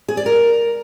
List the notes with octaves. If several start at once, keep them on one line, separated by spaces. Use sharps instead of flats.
G#4
D5
A#4